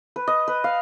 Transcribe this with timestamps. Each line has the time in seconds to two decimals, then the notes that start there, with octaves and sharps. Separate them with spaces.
0.16 B4
0.27 D#5
0.48 B4
0.64 F5